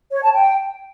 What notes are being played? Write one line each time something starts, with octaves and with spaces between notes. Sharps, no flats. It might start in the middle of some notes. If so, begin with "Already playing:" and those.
C#5
A5
G5